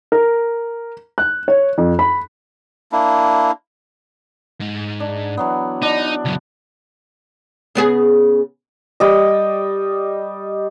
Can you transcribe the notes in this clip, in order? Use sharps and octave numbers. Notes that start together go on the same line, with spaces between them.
A#4
F#6
C#5
F2
B5
A#3 D4 E4
G#2
D4
E3 F#3 B3
D4 D#4
C#2 F#2
C#3 B3 G#4
G3 D#5